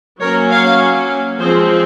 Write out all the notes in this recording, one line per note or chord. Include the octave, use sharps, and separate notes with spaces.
F#3 A#3 C#4 A#4 C#5
C#5 F5
F3 G#3 C4 G#4 C5